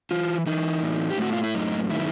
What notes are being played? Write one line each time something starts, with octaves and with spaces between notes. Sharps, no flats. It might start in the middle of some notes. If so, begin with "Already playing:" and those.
E3 F4
E3 D#4
A2
G4
A2 F#4
F4
E4
F#2 D#4
D#3 E4